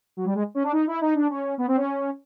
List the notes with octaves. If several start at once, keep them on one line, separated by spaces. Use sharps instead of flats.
F#3
G3
G#3
C#4
D4
D#4
E4
D#4
D4
C#4
B3
C4
C#4